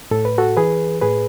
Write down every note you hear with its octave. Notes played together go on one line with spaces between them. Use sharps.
A2 A4
B4
F#4 A4
E3 G#4 B4
A2 G#4 B4